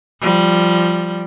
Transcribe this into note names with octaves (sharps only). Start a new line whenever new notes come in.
F3 G3